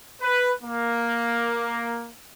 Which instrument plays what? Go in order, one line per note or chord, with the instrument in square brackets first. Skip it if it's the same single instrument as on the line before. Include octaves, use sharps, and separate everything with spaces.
[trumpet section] B4
A#3